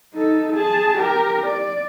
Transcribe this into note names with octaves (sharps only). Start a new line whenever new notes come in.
D#4 A4
G#4 A5
G4 A#4
D5